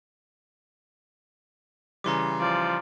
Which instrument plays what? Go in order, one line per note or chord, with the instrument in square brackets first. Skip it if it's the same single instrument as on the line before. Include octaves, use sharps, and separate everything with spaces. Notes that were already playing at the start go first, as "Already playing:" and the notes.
[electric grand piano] C#3 E3 G3 [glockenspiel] A#5 C6 D6
[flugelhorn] F3 [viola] D5